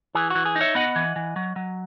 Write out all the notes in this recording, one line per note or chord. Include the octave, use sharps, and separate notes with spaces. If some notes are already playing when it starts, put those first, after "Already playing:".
E3 G#4
E3 F#4
G#4
D#4
C#5 E5
B3 D#5 F#5
E3
E3
F#3
F#3